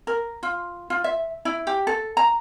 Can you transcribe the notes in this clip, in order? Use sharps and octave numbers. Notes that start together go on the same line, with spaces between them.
A#4
F4
F4
E5
E4
G4
A4
A#5